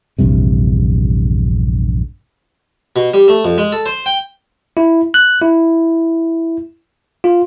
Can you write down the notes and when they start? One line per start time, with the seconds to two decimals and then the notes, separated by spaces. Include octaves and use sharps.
0.18 A#1 E2 G2 C3
2.96 B2
3.14 G3
3.28 A3
3.45 F2
3.58 G#3
3.72 A4
3.86 C5
4.06 G5
4.77 E4
5.14 F#6
5.41 E4
7.24 F4